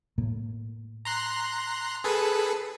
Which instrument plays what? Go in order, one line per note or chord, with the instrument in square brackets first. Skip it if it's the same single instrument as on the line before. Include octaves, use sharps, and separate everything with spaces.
[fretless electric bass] A2 A#3
[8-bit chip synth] A#5 C6 F#6
G#4 A4 B4